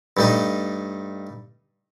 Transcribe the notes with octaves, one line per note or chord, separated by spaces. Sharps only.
G2 A3 D#4